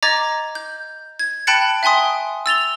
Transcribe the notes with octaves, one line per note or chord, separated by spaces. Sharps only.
D#5 A#5 D6 G#6 A6
G6
G#6
G5 A5 B5 F#6 A6 C#7
E5 G5 G#5 C6 D#6
E6 A6 F7 G7